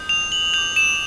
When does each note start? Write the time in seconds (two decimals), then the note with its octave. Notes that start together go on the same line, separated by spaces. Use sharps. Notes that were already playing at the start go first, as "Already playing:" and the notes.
Already playing: D#6 G6
0.09 F7
0.32 F#7
0.54 D6 G6 F7
0.76 E7